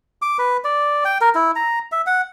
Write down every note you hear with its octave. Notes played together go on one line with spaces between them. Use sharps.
D6
B4
D5
G5
A#4
E4
A#5
E5
F#5